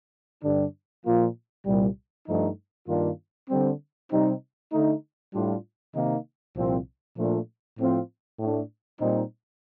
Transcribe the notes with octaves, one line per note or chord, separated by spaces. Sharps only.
G2 D3 G3 D4
A#2 F3 A#3 F4
C2 A#2 G3
G2 F3 A3 D#4
G2 D#3 A#3 D4 F4
D3 G3 C4
C3 G3 C4 D#4
D3 A3 D#4
A2 G3 D4 F4
C3 D#3 A#3 D#4
C2 A#2 F3 C4
A#2 F3 A3 D4 F4
A2 F3 C4 F4
A2 A3 D4
A#2 G3 C4 D#4